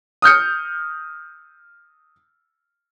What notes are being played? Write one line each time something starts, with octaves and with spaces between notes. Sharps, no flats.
D#6 F6 G6 C#7